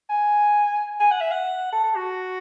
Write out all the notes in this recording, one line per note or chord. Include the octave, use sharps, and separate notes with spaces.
G#5
G#5
F#5
E5
F#5
A4
A4
F#4